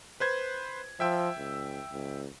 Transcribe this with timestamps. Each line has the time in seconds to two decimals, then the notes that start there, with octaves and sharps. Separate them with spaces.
0.20 B4 C5 G#6
1.00 F3 E5 G5 E6
1.38 C#2
1.92 C#2